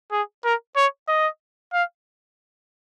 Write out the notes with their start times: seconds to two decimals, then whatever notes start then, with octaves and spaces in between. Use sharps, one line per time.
0.12 G#4
0.44 A#4
0.76 C#5
1.08 D#5
1.73 F5